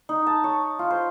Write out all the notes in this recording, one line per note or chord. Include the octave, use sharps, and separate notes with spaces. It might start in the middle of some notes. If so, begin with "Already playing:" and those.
D#4
A5
C#5
F4
C5